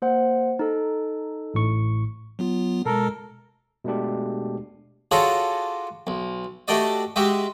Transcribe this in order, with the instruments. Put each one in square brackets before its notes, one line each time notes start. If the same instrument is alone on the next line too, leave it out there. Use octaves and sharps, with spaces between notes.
[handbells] A#3 C5 F#5
D#4 A4
[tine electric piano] A1 A2 C#6
[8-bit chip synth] F#3 B3 F4
[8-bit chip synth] B2 G#3 [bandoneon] A4 A#4
[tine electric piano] B2 G#3 A3 D4 G4
[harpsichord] D4 F4 F#4 G#4 A4 C#5
B1
A3 D4 F#4 G4 D5 D#5
G#3 F#4 G4 E5